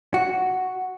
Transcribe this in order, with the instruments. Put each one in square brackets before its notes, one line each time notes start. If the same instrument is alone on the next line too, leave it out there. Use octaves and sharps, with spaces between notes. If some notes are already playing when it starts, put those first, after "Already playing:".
[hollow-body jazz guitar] F#4